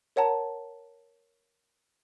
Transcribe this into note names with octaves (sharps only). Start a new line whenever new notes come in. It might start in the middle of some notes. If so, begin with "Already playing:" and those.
A#4 C#5 F#5 A5 A#5